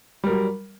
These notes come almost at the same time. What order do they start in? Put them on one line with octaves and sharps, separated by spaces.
G3 A#4 F#3